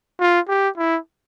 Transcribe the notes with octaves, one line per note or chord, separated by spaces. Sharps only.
F4
G4
E4